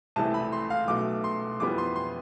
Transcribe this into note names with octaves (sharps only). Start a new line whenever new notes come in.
C2 C3 E3 A3 A5
B5
C6
F5
B1 B2 A3 D6
C6
F2 E3 G3 B3 D6
C6
C6